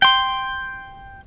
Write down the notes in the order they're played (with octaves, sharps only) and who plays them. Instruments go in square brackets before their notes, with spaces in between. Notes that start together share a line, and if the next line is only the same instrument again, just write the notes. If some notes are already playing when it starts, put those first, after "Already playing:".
[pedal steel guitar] G5 C6